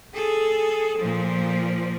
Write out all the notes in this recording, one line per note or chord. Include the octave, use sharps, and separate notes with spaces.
G#4 A4
A#2 F3